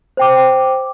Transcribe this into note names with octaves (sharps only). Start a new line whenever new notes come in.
C5 G5 D6